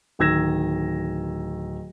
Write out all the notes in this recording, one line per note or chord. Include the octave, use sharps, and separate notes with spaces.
D1 D#3 E6 G#6 A#6 E7